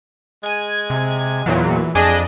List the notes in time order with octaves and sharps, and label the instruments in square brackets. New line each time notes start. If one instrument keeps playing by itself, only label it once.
[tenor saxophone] G#3 [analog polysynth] G#5 G#6
[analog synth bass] C3
[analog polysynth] E2 A#2 F#3 [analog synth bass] E3
[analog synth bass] F2 [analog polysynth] D4 D#5 [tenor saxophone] G#4